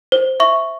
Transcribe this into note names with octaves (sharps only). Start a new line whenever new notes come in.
C5
E5 C#6